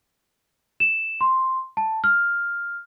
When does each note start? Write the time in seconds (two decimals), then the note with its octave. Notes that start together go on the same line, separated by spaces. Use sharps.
0.80 E7
1.21 C6
1.77 A5
2.04 F6